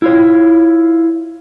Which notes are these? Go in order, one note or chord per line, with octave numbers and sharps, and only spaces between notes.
E4 F4 C#5